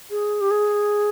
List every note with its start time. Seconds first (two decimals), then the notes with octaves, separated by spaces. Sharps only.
0.10 G#4
0.41 G4
0.51 G#4